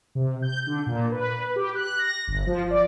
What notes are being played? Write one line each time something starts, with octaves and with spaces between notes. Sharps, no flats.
C3
G6
D3
A#2
B4
G4
F#6
A#6
G1
F3
D5